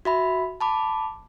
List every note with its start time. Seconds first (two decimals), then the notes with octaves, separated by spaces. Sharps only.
0.05 F#4 E5 B5
0.61 A5 B5 D6